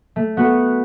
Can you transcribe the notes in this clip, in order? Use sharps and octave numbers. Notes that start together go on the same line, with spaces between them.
A3
B3 F#4 A4